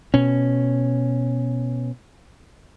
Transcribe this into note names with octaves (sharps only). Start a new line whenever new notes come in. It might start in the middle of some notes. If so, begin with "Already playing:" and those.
B2 C#4